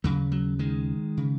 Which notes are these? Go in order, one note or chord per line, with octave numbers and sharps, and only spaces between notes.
D#2 C#3 F#3
F#3
D#3 G#3
C#3